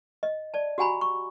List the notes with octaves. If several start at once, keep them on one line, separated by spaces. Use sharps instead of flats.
D#5
D5 A5
F#4 G4 F#5 G#5 A#5 B5
C#6